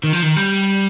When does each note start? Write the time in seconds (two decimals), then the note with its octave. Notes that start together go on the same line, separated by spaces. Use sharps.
0.04 D#3
0.13 F3
0.22 D#3
0.36 G3